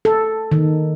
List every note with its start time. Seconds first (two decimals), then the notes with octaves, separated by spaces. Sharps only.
0.05 A4
0.52 D#3